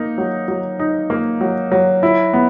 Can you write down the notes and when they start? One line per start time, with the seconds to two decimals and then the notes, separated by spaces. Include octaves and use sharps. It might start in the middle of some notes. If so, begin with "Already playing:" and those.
Already playing: A#3 D#4
0.18 F#3
0.48 F#3
0.79 D#4
1.10 A#3
1.41 F#3
1.72 F#3
2.03 E4
2.33 B3